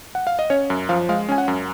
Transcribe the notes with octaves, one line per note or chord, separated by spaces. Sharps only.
F#5
F5
D#5
C#4 C#5
F#2
F3 F5
G#3 F5
C#4 G#5
F#5
F#2